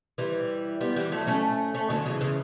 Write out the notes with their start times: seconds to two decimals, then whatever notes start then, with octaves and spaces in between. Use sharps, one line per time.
0.18 E3 G3
0.81 G3 B3
0.96 E3 G3
1.12 F#3 A3
1.27 A3 C#4
1.74 A3 C#4
1.90 D3 F#3
2.06 C#3 E3
2.21 C#3 E3